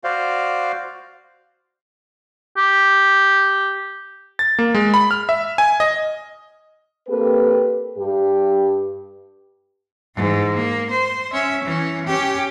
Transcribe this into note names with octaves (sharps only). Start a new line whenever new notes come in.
F#4 C5 D5 F5
G4
A6
A#3
G#3
B5
F6
E5
G#5
D#5
A#3 C4 G4 A4 B4
G2 G4
G#2 E3
A#3
C5
C#4 E5
E3 C#4
C#4 G4